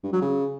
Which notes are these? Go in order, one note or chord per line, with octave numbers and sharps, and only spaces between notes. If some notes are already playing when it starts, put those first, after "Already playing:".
G2
F#3
C#3